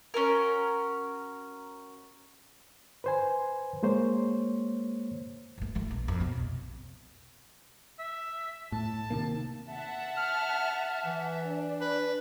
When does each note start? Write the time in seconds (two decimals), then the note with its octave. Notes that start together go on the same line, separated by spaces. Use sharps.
0.14 C#4 F#4 A#4
3.04 B4 C5 G#5
3.83 G#3 A#3 C5 C#5
5.58 G2 A3
5.75 E3 A3
5.91 A#1
6.08 F2
6.20 B1 C3
7.99 E5
8.72 A2 A5
9.10 C3 D#3 A#3
9.69 E5 F#5 A5
10.17 F6
11.05 E3
11.44 D4
11.81 B4